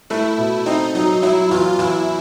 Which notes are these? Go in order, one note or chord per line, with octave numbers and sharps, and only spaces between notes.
A3 E4
B2
C4 D#4
F#3 D#4
F#3 E4
E2 F4
E2 E4